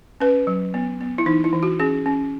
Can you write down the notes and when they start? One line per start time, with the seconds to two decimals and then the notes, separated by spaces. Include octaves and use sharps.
0.20 C#4 B4
0.47 F#3
0.74 B3
1.01 B3
1.18 E4
1.26 E3 D#4
1.44 E4
1.53 E3
1.63 F#4
1.80 C#4 G#4
2.06 C#4